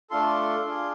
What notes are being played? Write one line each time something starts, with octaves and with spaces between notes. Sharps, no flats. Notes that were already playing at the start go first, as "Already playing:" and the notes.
A3 D4 F4 A4 C6
D4 F4 G#4